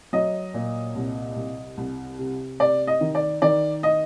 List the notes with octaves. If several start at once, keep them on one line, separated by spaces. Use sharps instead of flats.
F#3 D#5
A#2
C2
C2
C2
C3
C3 D5
D#5
D#3
D5
D#3 D5
D#5